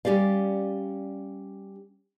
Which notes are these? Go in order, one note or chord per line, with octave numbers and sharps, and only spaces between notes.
G3 C#4 G4 D5 F5